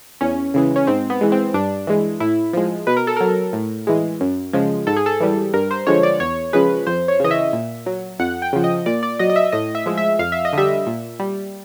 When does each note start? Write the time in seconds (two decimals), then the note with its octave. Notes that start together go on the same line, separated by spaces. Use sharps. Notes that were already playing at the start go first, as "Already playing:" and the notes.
0.21 E2 C#4
0.54 C#3 E3 G#3
0.76 C#4
0.87 G#2 C4
1.10 B3
1.21 E3 G#3
1.32 C4
1.54 G2 D4
1.87 E3 G#3
2.20 A2 E4
2.53 F3 G#3
2.87 B2 B4
2.97 A#4
3.07 A4
3.17 F#3 A#4
3.53 A2
3.87 E3 G#3
4.20 F#2
4.53 C#3 F3 G#3
4.87 G#2 A4
4.96 G#4
5.06 A4
5.20 E3 G3
5.54 G2 A#4
5.71 C5
5.87 D3 F3 G#3 C#5
6.03 D5
6.20 E2 C#5
6.53 C#3 F3 G#3 B4
6.87 F2 C5
7.08 C#5
7.20 C#3 E3 D#5
7.31 E5
7.53 A#2
7.86 F#3
8.19 F2 F#5
8.42 G5
8.53 C#3 F3
8.64 D#5
8.86 A#2 D5
9.03 D5
9.19 F#3 D#5
9.30 D#5
9.36 E5
9.52 A2 D#5
9.75 E5
9.86 F3 G#3
9.98 E5
10.19 F2 F5
10.32 E5
10.45 D#5
10.53 D3 G3 E5
10.86 A#2
11.19 G3